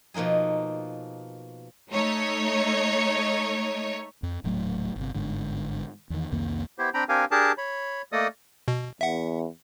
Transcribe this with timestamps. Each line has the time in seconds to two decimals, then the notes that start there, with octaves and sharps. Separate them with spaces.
0.14 B2 F3 A#3 D#4 G#4
1.91 A3 D#4 C#5
4.23 F2
4.44 D#1 A2 F#3 A3
4.96 G1 C3
5.15 G1 G#2 D3
6.10 E2 D#3
6.32 C2 F2 D#3 A#3
6.78 B3 E4 G4 C5
6.94 C4 D4 G5 A#5 B5
7.09 C4 D4 G4 A#4 F5 G#5
7.31 D4 G4 G#4 A#4 A5
7.58 C#5 B5
8.12 A3 A#3 A4 D5 D#5 D#6
8.68 B2
9.01 E2 E5 F#5